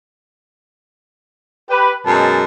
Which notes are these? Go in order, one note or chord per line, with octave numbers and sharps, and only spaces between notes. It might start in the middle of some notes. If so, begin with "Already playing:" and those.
G4 B4
F#2 B2 G#3 A5